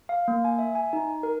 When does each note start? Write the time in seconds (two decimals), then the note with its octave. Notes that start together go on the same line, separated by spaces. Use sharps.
0.09 F5
0.28 A#3
0.44 G#5
0.59 E5
0.75 G#5
0.93 D#4
1.23 A#4